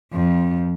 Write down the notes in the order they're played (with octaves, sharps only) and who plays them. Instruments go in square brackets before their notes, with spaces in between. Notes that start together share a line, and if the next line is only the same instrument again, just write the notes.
[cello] F2